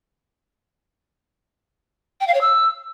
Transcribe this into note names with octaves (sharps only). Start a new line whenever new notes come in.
G5
F5
C#5
E6